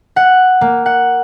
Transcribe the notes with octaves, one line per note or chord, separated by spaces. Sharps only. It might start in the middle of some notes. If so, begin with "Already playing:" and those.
F#5
A#3
F#5